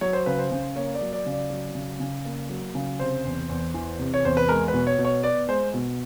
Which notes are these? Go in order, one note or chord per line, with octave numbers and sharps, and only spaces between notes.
F#3 C#5
C5
C#3 B4
C5
C#3
A#3 C#5
D5
F#3
D5
C#3
D5
F#3
C#3
C#3
A#3
F#3
C#3
C3 C5
E2
E2
E3
C3
C#5
E2 C5
B4
G#3 A#4
B4
B2
C#5
B2
C#5
B3 D5
G#3 C5
B2